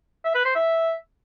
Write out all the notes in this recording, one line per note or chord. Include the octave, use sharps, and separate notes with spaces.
E5
B4
C5
E5